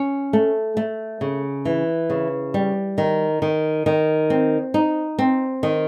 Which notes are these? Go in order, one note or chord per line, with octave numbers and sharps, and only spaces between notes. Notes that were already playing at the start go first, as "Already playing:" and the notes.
Already playing: C#4
A3
A3
C#3
E3
C#3
G3
D#3
D#3
D#3
C4
D#4
C4
D#3